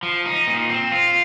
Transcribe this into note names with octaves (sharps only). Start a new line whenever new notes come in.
F3
D#4
A#2
C4
F4